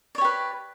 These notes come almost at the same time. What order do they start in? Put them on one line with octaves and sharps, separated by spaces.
D5 C#5 G4 B4